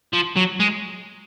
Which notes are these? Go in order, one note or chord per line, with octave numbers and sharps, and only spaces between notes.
F3
F#3
G#3